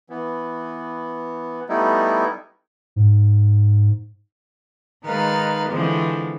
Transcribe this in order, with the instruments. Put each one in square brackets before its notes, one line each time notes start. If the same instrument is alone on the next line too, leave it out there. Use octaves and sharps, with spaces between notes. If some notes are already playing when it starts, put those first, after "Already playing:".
[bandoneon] E3 B3
G3 A3 B3 D#4 E4
[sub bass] G#2
[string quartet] D#3 G#3 D#4 B4 F5 A6
D3 E3 F3 G#3 C4